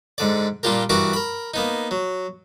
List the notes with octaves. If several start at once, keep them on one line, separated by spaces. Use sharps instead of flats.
G#2 D3 D5
A#2 G3 D4 F4 G4 A#4
G2 E3 F#4 A#4 D6
A#4 B5
A#3 B3 D#4
F#3